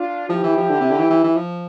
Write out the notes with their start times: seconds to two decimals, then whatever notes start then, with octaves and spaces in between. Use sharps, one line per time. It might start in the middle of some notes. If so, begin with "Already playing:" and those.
Already playing: D4 F4
0.29 F3 E4 G4
0.43 E3
0.57 F3
0.70 D3
0.80 C3
0.91 D3
0.99 E3
1.10 E3
1.24 E3
1.36 F3